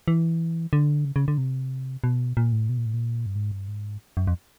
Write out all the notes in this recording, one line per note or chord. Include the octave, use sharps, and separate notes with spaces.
E3
D3
C#3
C#3
D3
C3
B2
A#2
A2
B2
A#2
A2
A#2
G2
G#2
G2
G#2
F#2
F2